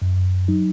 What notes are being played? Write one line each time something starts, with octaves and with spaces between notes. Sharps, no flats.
F#2
F#3 D#4